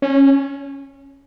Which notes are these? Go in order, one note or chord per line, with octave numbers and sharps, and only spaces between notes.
C#4